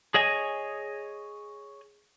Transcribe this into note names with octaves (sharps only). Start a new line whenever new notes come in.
G#4 C#5 D#5 G#5